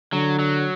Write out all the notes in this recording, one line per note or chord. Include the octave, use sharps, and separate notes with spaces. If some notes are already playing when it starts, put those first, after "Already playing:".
D3 F#3
F#3